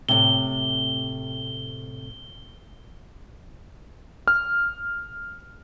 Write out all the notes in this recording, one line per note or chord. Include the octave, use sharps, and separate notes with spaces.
A2 C3 G7
F6